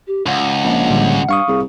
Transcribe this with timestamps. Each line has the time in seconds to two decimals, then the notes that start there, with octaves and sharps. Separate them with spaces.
0.07 G4
0.26 C#2 F#5
0.64 A#1
0.90 A2 D3 G3
1.29 G2 F5 C#6 D#6
1.48 C2 G#4